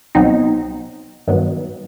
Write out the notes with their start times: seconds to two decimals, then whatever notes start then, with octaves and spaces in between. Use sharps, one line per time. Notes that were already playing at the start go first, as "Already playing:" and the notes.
0.15 C2 B2 F#3 C4 D#4
1.28 G2 D#3 F#3 B3